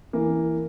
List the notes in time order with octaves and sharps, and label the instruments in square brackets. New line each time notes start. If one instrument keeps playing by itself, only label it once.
[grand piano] E3 A#3